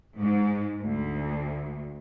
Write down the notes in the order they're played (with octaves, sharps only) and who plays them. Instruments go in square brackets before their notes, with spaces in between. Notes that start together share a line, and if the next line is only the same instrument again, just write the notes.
[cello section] G#2
D2